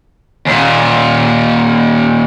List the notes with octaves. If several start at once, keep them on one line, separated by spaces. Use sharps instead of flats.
D#2 A#2